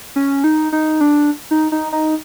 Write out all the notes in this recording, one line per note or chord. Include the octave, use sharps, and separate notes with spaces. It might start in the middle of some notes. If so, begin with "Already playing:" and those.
C#4
D#4
D#4
D4
D#4
D#4
D#4